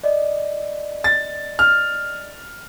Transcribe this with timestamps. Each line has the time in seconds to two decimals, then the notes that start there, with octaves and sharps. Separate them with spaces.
0.04 D5 D#5
1.04 A6
1.59 F6